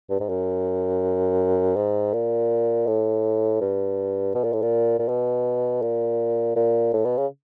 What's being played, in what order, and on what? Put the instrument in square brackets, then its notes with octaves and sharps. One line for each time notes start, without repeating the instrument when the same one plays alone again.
[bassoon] G2
G#2
F#2
G#2
A#2
A2
G2
B2
A#2
A2
A#2
A#2
B2
A#2
A#2
A2
B2
C#3